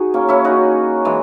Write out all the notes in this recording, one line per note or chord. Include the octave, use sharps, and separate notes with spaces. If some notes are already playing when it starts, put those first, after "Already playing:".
Already playing: D#4 F#4 G#4
A#3 C#4
C#4 E4
D#4 F#4
E3 G#3